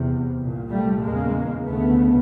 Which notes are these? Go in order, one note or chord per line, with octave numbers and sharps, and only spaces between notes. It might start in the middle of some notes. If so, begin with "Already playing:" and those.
Already playing: E2 C3
C2 A#2
G3 A3
E2 C#3 G#3 A#3
D2 C#3 A3 B3